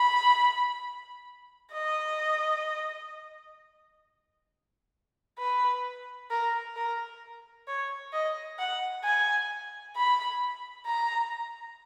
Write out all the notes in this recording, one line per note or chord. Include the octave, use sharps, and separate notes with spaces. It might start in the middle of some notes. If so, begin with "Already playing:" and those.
Already playing: B5
D#5
B4
A#4
A#4
C#5
D#5
F#5
G#5
B5
A#5